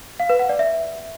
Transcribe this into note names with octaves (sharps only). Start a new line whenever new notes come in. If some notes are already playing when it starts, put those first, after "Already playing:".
F5
B4
F#5
D5
E5